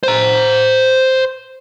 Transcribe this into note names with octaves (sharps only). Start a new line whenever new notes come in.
C5 A#5